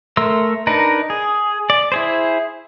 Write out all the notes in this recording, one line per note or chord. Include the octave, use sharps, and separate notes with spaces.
A3 A#4 C6 E6
D4 D#4 A#4 B4
G#4
D5
E4 G#4 C5